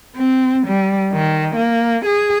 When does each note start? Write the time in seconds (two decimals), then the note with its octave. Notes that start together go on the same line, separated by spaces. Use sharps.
0.16 C4
0.67 G3
1.13 D#3
1.56 A#3
2.06 G#4